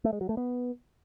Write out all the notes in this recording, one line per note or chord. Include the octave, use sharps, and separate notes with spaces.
A3
G#3
F#3
A3
B3